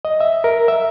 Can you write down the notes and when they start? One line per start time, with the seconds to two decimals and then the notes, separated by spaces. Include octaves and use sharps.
0.05 D#5
0.21 E5
0.44 A#4
0.68 E5